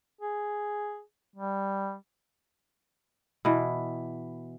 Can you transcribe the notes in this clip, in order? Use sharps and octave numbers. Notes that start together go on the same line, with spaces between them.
G#4
G3
B2 E3